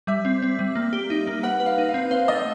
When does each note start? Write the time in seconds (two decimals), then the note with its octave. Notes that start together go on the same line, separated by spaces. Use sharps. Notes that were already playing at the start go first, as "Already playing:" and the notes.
0.07 G3 E5
0.25 C4
0.42 C4
0.59 G3
0.75 A#3
0.93 G4
1.10 D#4
1.27 A#3
1.43 B4 F#5
1.60 B4
1.66 F5
1.78 D#4
1.89 F5
1.94 C4
2.11 C5 F5
2.28 A3 D#5